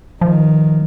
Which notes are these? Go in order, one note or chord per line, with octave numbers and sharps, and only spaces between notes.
D#3 F3